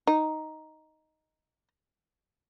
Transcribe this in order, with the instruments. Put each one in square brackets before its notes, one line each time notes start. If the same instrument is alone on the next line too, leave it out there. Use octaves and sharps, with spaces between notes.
[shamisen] D#4